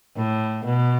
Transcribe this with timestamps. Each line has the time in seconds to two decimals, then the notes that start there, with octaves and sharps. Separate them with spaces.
0.17 A2
0.65 B2